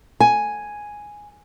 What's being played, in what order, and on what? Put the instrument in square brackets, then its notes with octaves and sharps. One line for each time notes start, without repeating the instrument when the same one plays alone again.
[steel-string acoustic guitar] G#5